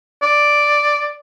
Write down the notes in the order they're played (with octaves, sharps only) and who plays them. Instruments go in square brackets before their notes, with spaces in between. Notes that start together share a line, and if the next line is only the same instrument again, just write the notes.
[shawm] D5